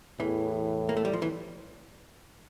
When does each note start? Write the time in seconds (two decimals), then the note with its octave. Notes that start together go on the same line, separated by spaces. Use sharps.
0.20 E2 A2 E3
0.89 A#3
0.97 A3
1.05 G3
1.13 F3
1.22 E3